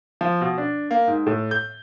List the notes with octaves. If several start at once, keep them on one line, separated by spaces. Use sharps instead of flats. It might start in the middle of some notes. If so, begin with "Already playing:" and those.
F3
B2
D4
A#3
G#2
A2
G6